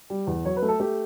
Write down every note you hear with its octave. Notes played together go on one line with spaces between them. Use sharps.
G3
E2
F#3 C#5
B4
A3
A4
A3 G4